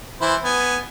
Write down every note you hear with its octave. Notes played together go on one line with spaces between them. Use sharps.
E3 E4 C5
B3 G#5